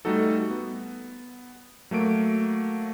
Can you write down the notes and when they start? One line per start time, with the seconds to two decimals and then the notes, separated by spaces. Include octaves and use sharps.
0.05 G3 A3 D#4 F#4 A4
0.50 B3
1.91 F#3 A3 A#3 D7